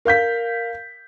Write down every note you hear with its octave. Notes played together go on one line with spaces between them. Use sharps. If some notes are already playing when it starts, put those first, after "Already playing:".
A#4 F5 G6 B6